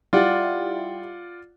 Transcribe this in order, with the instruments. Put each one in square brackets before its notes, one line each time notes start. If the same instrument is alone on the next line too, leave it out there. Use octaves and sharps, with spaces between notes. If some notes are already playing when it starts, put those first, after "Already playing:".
[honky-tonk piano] G3 E4 G4 [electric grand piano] F4 D5 F#5